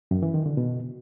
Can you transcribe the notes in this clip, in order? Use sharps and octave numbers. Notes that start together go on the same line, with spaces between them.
F#2
E3
D#3
D3
B2